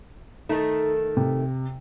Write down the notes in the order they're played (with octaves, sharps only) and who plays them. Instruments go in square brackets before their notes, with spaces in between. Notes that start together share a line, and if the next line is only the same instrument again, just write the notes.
[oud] D#3 A3 [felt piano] D#4
[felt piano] C3